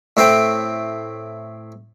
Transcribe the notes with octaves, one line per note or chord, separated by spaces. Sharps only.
A2 C4 G5